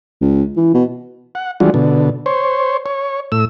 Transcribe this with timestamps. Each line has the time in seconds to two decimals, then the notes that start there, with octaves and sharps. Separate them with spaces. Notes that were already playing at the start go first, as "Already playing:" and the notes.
0.21 C#2
0.57 E3
0.74 B2
1.35 F#5
1.60 E3 G3 G#3 D4 F4 F#4
1.74 B2 D3
2.26 C5 C#5
2.86 C#5
3.32 A2 E6